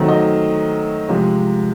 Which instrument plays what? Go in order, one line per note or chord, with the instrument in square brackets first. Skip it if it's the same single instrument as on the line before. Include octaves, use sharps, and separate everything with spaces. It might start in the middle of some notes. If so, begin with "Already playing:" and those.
Already playing: [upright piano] D#3 F#3 A3 C4
D#5
C3 F3 G#3